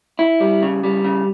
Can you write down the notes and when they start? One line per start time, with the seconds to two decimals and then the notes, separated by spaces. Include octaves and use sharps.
0.19 E4
0.40 G3
0.62 C#3
0.83 G3
1.04 C#3